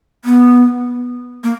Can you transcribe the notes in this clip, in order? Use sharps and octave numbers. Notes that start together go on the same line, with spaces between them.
B3
A#3